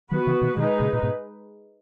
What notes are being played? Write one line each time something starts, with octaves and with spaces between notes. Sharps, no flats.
D#3 F#3 B3 F#4 B4
C#3 E3
B2 D#3
B2 D#3 G#3 D#4 G#4 B4
A#2 C#3
A#2
G#2 B2